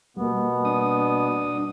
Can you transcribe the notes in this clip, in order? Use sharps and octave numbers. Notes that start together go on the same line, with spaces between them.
B2 G3 A#3 B3
D4 D#6